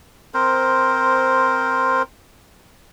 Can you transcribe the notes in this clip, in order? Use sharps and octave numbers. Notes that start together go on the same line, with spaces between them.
C4 A#4 C5